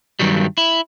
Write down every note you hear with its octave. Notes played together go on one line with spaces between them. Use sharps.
G2 C3 D#3 F#3 G3
E4